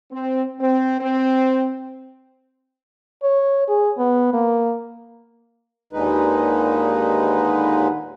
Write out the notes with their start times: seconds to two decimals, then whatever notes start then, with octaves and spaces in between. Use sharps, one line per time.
0.12 C4
0.60 C4
1.00 C4
3.23 C#5
3.68 G#4
3.98 B3
4.33 A#3
5.93 D#2 A#2 D3 G#3 D#4 B4